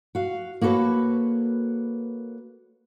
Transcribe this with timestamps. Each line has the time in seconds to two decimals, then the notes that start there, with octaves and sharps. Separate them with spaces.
0.15 F#4 F5
0.61 A#3 F#4 A4 B4 C#5